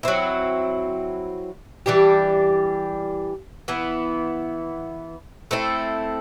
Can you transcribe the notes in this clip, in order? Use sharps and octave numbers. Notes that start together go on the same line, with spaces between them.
F#3 C4 E4
E3 G3 D4 G4
E3 B3 E4
A3 C4 E4 A4